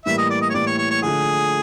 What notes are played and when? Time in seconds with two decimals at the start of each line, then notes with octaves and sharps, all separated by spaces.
0.06 A2 E3 G3 A#3 E5
0.18 D#5
0.30 D5
0.41 D#5
0.50 C#5
0.54 A2 E3 G3 A#3 D5
0.66 C#5
0.78 C#5
0.90 C#5
1.02 D3 F3 A3 G#4